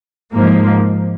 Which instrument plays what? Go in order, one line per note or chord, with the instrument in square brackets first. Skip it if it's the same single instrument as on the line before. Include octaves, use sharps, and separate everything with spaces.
[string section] G#2 F3 A#3